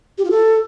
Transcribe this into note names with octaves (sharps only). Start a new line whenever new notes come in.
G4
F4
A4